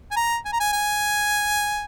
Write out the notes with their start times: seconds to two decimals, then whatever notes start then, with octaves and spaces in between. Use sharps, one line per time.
0.11 G#5
0.16 A#5
0.45 G#5
0.53 A#5
0.60 G#5
0.73 G#5